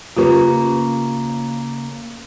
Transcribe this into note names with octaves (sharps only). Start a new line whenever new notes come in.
C#3 A#3 F4 G4 B4 C#5